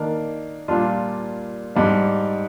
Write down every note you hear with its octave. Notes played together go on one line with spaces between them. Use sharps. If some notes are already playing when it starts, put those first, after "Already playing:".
Already playing: D#3 A#3 D4
A#2 G3 D4 F4
G#2 G3 D4